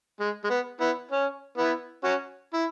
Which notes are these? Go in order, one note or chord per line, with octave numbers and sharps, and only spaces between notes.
G#3
G#3
B3
B3 E4
C#4
B3 E4
C#4 F#4
E4